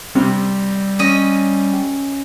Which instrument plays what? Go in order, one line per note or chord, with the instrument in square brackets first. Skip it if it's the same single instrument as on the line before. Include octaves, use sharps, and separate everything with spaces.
[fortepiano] C3 [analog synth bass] G3
[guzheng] C#4 D#5